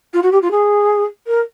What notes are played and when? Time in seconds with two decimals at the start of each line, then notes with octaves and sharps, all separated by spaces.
0.13 F4
0.23 F#4
0.32 G4
0.42 F4
0.51 G#4
1.27 A#4